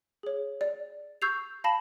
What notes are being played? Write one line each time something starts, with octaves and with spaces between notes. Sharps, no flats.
G#4 C#5
D5
C#6 E6 G6 G#6 C7 F7
F5 A5 B5 A#6 E7 F#7